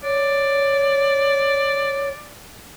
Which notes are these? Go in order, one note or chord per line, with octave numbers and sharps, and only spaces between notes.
C#5 D5